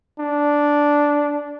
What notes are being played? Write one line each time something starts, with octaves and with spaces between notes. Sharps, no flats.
D4